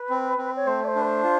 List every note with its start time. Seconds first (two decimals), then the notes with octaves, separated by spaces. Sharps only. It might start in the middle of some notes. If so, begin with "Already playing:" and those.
Already playing: B4
0.10 C4
0.38 C4
0.56 C#5
0.66 A3 C5
0.84 D5
0.87 C5
0.96 D4
1.01 B4
1.04 C5
1.23 F4